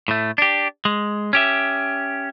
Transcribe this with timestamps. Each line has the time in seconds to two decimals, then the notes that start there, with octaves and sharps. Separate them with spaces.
0.08 A2 A3
0.38 D4 G4
0.85 G#3
1.33 C#4 G4 E5